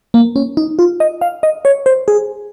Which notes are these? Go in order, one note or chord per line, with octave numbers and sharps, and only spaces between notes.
A#3
C#4
D#4
F4
D#5
F5
D#5
C#5
C5
G#4